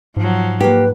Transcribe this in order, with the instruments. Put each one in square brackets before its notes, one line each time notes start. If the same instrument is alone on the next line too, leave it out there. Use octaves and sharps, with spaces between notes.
[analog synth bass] G#2 [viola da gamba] F3 F#3
[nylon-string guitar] A#3 G4 [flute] B4